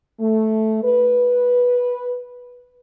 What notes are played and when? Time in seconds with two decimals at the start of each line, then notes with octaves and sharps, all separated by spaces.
0.19 A3
0.83 B4